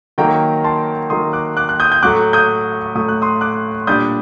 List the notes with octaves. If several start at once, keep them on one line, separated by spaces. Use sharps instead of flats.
D#3 F#3 A#3 G5 A#5
A5 C6
D#3 F#3 A#3 C6 D#6
D6 F#6
D6 F#6
F#6
D#6 G6
G6
A2 F#3 A3 D6 F#6
D#6 G6
A2 F#3 A3 D#6
F#6
C6 D#6
D6 F#6
A#2 G3 D4 D#6 G6